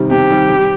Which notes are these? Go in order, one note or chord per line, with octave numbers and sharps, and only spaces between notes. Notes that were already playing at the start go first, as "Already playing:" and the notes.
Already playing: C3 D#3 G3
C3 G4
D#3 G3
G3